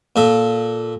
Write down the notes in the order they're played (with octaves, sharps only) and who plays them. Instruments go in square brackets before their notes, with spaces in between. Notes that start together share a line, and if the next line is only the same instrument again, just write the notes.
[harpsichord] A#2 A4